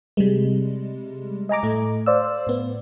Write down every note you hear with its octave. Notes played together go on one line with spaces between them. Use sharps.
C3 G3 G#3
D#5 G#5 A#5 D6
A2 A3
C5 D5 F5 E6
A2 B3